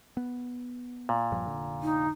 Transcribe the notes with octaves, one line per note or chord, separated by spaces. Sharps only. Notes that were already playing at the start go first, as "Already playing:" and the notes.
B3
A#2
D#1 G2 F3
F1 D3
D#4